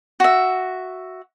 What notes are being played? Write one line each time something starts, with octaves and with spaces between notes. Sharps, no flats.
F#4 E5